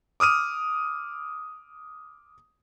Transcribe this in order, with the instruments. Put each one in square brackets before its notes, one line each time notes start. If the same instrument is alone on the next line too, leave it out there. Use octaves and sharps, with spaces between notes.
[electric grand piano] D6 D#6 F6 D#7